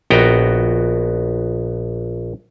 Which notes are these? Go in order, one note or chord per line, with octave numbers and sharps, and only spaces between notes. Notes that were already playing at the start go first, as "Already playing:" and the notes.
A#1 B3 F#4 D#5 G5 A#5